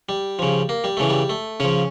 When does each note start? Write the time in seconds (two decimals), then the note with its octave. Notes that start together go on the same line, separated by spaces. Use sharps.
0.09 G3
0.39 C#3 F3
0.69 A#3
0.84 G3
0.97 C#3 E3 A3
1.10 G3
1.29 A3
1.60 C#3 F3 C#4